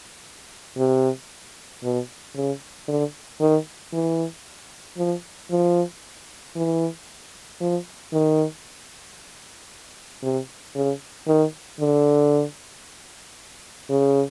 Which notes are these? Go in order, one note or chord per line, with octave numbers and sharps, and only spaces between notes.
C3
B2
C#3
D3
D#3
E3
F3
F3
E3
F3
D#3
C3
C#3
D#3
D3
C#3